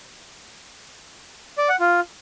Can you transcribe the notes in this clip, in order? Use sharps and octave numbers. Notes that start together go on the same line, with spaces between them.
D5
F#5
F4